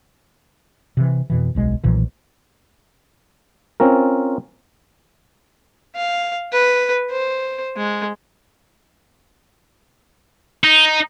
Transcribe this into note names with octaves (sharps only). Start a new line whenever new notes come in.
C3 E3
F2 B2 E3
D1 B1 G#3
B1 A#2 E3 F3
C4 C#4 F4 A#4
F5
B4
C5
G#3
D#4